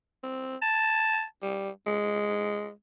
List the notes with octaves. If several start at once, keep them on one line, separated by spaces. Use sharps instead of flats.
C4
A5
G3
G#3